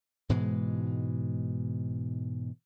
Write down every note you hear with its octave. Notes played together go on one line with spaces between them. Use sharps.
G#2 B2 E3 G#3